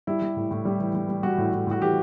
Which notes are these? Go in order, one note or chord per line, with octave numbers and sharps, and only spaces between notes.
G3 E4
G3
A2
A2
G3
E3
G3
G3
G3 F#4
A2
A2
A2 F#4
E3 G4